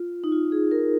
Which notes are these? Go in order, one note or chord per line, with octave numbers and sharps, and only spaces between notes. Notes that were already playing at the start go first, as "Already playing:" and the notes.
Already playing: F4
D#4
F4
G#4
A#4